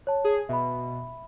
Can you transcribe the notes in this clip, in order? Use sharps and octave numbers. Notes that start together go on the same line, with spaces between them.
C#5 A5
G#4
B2 E5 B5